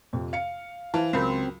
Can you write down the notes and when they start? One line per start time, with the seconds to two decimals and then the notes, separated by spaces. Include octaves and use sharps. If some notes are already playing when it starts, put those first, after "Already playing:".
0.13 F2 C3
0.33 F5 C#7
0.94 E3 C5 F5 A5
1.13 C#2 F#3 C4 A#4 B5